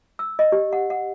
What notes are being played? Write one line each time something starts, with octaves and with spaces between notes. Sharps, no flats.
E6
D#5
G4
F#5
F#5